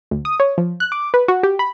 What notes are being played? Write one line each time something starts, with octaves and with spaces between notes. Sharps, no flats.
D2
D#6
C#5
F3
F#6
D6
B4
F#4
G4
B5